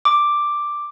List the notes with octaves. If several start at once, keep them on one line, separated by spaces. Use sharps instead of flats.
D6